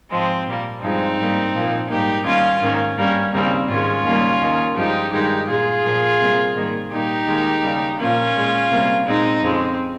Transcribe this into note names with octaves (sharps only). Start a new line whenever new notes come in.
G#2 F3 G#3 C4
A#2 G3 A#3
G2 F3 G#3 C4 D#4
G#2 G3 A#3
A#2 F3 A#3
G#2 G3 A#3 D#4 G4
D#2 D#3 G3 A#3 C#4 F4
G#2 D#3 A#3 C#4
G2 G3 A#3 C#4
D#2 C#3 G3 A#3 C4
G#2 D#3 G#3 C#4 F4
D#2 C#3 G3 A#3
D#2 D#3 A#3
G2 F3 G#3 D#4 G4
G2 D#3 G#3 D#4 G4
A#2 G#3 F4 G#4
A#2 F3 A#3
C3 G3 A#3
G#2 D#3 G3 A#3
A#2 G3 A#3 D#4 G4
D#2 D#3 G#3
D#2 C#3 G3
A#2 F3 A#3 C#4 F4
A#2 G#3
C3 G3 A#3
A#2 G#3 C4 D#4
F2 C#3 G#3 C4